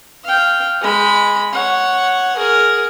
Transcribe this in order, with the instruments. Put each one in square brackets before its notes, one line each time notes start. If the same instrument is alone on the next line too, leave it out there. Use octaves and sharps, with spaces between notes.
[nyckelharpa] F5 G5
G#3 B5
C#5 F#5
G#4 A#4